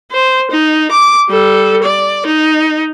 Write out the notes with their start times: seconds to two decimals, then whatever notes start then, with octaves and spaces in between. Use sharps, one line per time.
0.11 C5
0.51 D#4
0.91 D6
1.29 G3 A4
1.83 D5
2.26 D#4